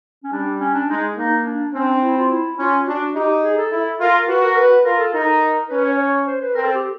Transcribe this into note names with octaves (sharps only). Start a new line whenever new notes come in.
C#4
G3 D4
C#4
D4
G#3 D#4
A#3 D#4
D4
C4 C#4
D4
E4
F4
E4
C#4 F4
D4 F#4
D#4 G4
G#4
A4
E4
F4 A#4
F#4 B4
A#4
B4
F4 A#4
A4
D#4 A#4
C#4 B4
C#5
C#5
C5
B4
C4 A#4
A4
G4